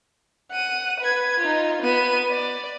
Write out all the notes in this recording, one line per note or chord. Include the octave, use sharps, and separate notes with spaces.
F#5 D#7
B4 G#6
D#4 F4
B3 D#7
D5